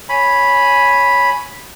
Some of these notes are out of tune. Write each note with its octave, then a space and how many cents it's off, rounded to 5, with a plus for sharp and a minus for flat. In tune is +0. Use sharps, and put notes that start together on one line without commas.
C#5 +0 G#5 +0 B5 -5